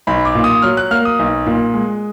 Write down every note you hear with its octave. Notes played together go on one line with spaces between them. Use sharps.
B1 B5
D6
A#2
D#6
F#3 F6
F#6
A#3 F6
D#6
B1
A#2
G#3